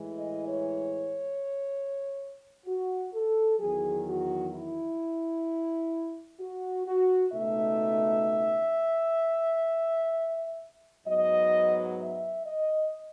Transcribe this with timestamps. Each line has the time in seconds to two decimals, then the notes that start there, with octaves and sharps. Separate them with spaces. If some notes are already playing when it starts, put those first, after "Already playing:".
Already playing: A2 E3 G#3
0.17 D#5
0.48 C#5
2.66 F#4
3.13 A4
3.59 E2 D#3 F#3 G#4
4.06 F#4
4.53 E4
6.40 F#4
6.86 F#4
7.32 C#2 B2 A3 D#4 E5
11.06 G#2 F#3 B3 D#5
11.99 E5
12.46 D#5